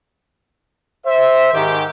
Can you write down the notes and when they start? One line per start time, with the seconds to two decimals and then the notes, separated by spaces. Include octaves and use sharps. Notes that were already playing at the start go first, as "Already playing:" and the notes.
1.06 C5 E5
1.53 G#2 D#3 G4